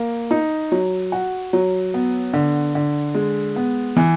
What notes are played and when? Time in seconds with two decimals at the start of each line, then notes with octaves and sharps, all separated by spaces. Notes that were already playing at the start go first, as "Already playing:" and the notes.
Already playing: A#3
0.31 D#4
0.72 F#3
1.12 F#4
1.53 F#3
1.94 B3
2.33 D3
2.75 D3
3.15 G#3
3.56 B3
3.97 E3